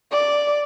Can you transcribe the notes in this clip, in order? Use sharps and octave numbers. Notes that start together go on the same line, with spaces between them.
D5